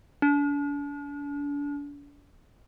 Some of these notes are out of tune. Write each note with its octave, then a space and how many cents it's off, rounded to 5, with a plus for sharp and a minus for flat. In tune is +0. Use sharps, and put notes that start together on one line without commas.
D4 -40